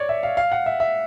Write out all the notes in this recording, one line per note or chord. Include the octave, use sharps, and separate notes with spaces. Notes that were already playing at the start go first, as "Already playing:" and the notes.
Already playing: C#5 D5
E5
F5
F5
F#5
E5
E5